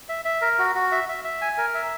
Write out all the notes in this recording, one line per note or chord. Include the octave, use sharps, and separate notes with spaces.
E5
E5
A#4
F#4
F#4
E5
E5
E5
G#5
A#4
E5